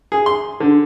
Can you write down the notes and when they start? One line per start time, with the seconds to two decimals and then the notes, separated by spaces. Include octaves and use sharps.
0.12 G#4
0.26 C6
0.60 D3